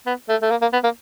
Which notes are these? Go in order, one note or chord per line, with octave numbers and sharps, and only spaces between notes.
B3
A3
A3
A#3
A#3
B3
A#3